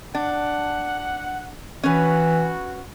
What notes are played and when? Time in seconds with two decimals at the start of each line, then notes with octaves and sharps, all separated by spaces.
0.15 D4 F#5
1.83 E3 C#4 F#4 B4